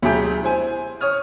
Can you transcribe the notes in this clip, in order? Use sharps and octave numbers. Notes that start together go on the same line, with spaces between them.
D2 B2 F#3 G4 G#4 G6
E4 C5 G#5
C#5 D#6 F6